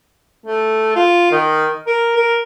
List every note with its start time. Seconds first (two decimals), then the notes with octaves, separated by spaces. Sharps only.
0.46 A3
0.96 F4
1.31 D#3
1.87 A#4
2.16 A#4